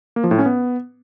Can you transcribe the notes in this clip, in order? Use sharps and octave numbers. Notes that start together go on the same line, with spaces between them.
A#3
F3
A2
C#4
B3